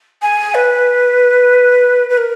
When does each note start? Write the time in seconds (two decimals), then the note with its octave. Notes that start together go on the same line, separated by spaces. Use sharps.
0.21 G#5
0.54 B4
2.09 B4
2.17 A#4